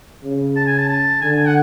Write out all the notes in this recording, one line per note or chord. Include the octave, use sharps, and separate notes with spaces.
C#3
A5
G#5
A5
A5
D3 G#5
G#5
F#5